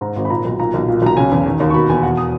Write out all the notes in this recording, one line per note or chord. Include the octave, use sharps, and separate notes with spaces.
G#2 A#5
G#1
B5
A#2 A#5
B1
A#2 A#5
B1
A#2
B1 A#5
C#3 G#5
E2
D#3
D#2
C#6
B2 B5
E2 G#5
B2 F#5
D#6